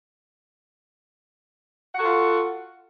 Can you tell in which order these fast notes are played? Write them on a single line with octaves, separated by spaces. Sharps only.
F#5 F#4 A4 F4